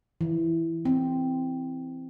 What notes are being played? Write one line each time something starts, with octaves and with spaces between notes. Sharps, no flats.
E3
C4